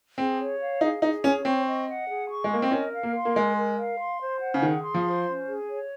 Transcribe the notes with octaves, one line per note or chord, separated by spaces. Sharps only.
C4 G#4
C#5
F5
D#4 G#4
D#4 G#4
C#4 C#5
C4 C#6
D#5
F#5
G#4
C#6
G#3
A#3 D#5
C4
C#4 A#4
F5
A#3
C6
A#3
G#3 A#4
A#4
F5
C6
C5
F#5
C#3
D#3 G#4
C6
F3
C5
C#4
G#4
C#5